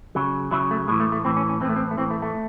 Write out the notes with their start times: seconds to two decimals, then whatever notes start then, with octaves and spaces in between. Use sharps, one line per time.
0.15 C#3 F#3
0.51 C#3 F#3 E4
0.71 A3
0.88 A2 E3 G#3
1.00 A3
1.12 A3
1.25 A2 E3 C4
1.37 C#4
1.49 C#4
1.61 E3 C4
1.65 A2 A3
1.76 C4
1.91 A3
1.98 A2 E3 C4
2.11 A3
2.22 A3